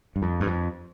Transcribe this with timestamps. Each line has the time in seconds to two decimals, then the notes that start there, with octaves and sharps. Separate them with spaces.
0.16 G2
0.22 F2
0.40 G2
0.47 F2